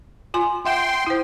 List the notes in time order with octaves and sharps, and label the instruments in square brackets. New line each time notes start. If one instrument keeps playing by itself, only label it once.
[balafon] F4 G#5 C6
[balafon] E5 F#5 [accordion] G5 C6
[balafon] E4 C5